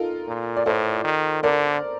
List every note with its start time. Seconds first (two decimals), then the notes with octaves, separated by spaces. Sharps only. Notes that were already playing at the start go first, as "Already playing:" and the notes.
Already playing: D#4 F4 A4 A#4
0.27 A#2
0.56 D5
0.66 A2 A4 C5
1.04 D#3
1.43 D3 A#4 D5